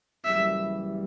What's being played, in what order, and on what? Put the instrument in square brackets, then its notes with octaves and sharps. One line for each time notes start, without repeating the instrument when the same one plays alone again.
[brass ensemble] F#1 F#2 E3 G3 [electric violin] E5